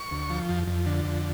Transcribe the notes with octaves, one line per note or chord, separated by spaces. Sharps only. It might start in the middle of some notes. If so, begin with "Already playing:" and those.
Already playing: C#6
D2
F3
F2
F2
D3
F2